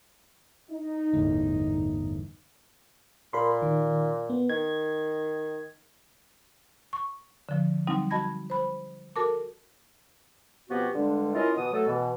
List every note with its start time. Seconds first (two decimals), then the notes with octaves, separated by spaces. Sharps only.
0.70 D#4
1.14 G1 E2 A2
3.33 A#2 A#4 B5 C6
3.62 D#3
4.30 B3
4.49 D#3 G#6
6.93 C#6
7.49 D3 F3
7.87 F#3 G3 C4 D#4
8.10 F#4 D#5 A5 B5 G#6 A#6
8.50 C5 B5
9.16 F#4 A4 A#4 A5 D6
10.69 B2 F3 B3 C4 F#4 G4
10.94 G2 D3 G3 G#3 D4
11.35 C#4 E4 F4 A#4 D#5
11.57 B2 E3 D#6
11.73 F#3 A3 A4
11.87 B2 E3